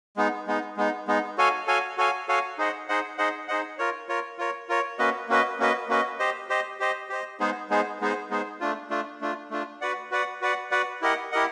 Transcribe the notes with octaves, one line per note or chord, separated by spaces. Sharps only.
G#3 B3 D#4
G#3 B3 D#4
G#3 B3 D#4
G#3 B3 D#4
F#4 A4 C#5 F5 G#5
F#4 A4 C#5 F5 G#5
F#4 A4 C#5 F5 G#5
F#4 A4 C#5 F5 G#5
D#4 G#4 C5 D#5 F#5
D#4 G#4 C5 D#5 F#5
D#4 G#4 C5 D#5 F#5
D#4 G#4 C5 D#5 F#5
F4 A#4 C#5
F4 A#4 C#5
F4 A#4 C#5
F4 A#4 C#5
A#3 C#4 F#4 B4 D#5
A#3 C#4 F#4 B4 D#5
A#3 C#4 F#4 B4 D#5
A#3 C#4 F#4 B4 D#5
G4 C5 D#5
G4 C5 D#5
G4 C5 D#5
G4 C5 D#5
G#3 B3 D#4 G#4 C5
G#3 B3 D#4 G#4 C5
G#3 B3 D#4 G#4 C5
G#3 B3 D#4 G#4 C5
A3 D4 F4
A3 D4 F4
A3 D4 F4
A3 D4 F4
F#4 B4 D5 F#5
F#4 B4 D5 F#5
F#4 B4 D5 F#5
F#4 B4 D5 F#5
E4 G4 A#4 D#5 F#5
E4 G4 A#4 D#5 F#5